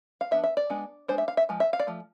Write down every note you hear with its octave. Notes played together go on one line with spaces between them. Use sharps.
F5
F3 B3 D4 E5
E5
D5
G#3 B3 D4
G#3 B3 D4 C5
E5
F5
E5
F3 G#3
E5
F5
D5
F3 A3